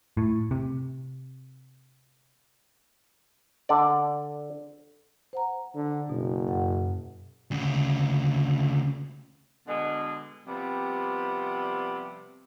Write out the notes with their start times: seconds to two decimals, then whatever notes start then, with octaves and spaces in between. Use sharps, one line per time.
0.17 A2
0.51 C3
3.69 D3 D5
5.33 C5 F#5 A#5
5.75 D3
6.09 F#1 B2
6.47 F#2 F#5
7.51 D2 C#3
9.67 B2 D3 G#3
10.47 C3 F3 G3 B3